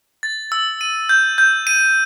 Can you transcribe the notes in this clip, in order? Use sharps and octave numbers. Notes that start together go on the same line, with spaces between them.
A6
E6
D#7
G6
G6
D#7